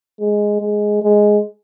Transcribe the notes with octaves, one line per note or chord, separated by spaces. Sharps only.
G#3
G#3
G#3